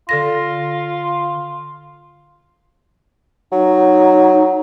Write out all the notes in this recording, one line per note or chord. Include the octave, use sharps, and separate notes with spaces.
D3 F4 A4 A#6
F#3 D#4